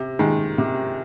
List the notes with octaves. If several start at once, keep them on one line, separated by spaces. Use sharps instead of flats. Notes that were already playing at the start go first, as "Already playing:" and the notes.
Already playing: C3
D#3 G#3
C3